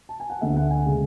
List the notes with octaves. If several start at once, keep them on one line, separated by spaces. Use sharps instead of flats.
A5
G#5
F#5
D2 D3 A3 E5
F#5
G#5
C#3 G#3